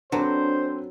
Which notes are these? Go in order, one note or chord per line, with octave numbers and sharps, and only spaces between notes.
F#3 C4 D4 A4 B4 C5